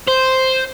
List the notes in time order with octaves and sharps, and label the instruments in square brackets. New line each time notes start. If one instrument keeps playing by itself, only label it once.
[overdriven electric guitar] C5